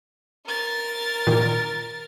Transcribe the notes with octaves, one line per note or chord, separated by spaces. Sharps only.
A#4 A6
A#2 D#3